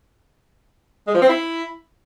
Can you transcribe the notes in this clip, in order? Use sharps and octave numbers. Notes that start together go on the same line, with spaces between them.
G#3
F3
C4
E4